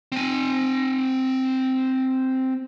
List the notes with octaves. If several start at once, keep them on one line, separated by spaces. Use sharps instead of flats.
C4 G#5